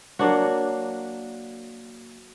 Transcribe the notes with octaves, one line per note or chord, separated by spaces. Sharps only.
F#3 A#3 D4 F#4